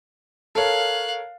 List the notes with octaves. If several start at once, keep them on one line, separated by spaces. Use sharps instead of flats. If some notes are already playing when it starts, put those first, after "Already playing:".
A4 A#4 C#5 F5 F#6